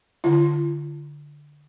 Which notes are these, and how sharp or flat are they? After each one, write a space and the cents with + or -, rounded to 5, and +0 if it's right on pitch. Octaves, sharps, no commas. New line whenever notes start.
D3 +0 F4 -35